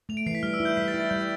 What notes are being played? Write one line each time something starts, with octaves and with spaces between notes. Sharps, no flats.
A3 F7
D7
E3 C7
B6
G3 F6
E6
E4
G6
G3 B6
A6
E4
A6
G3 G6